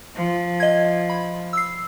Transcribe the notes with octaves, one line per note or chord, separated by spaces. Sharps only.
F3
D#5 G#6
B5
E6 C7